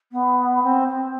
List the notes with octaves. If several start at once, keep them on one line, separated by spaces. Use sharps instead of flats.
B3
C4
C4